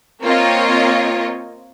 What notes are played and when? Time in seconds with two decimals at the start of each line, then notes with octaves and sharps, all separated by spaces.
0.23 A#3 C4 F4 C#5 D#5